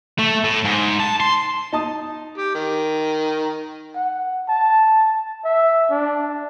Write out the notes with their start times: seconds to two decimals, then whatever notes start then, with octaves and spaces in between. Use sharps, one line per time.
0.19 A3
0.44 A2
0.65 G#2
0.99 A5
1.20 C6
1.73 D#4 A5 D#6
2.37 G4
2.55 D#3
3.95 F#5
4.49 A5
5.44 E5
5.90 D4